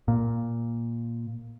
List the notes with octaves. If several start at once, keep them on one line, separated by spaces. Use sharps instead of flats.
A#2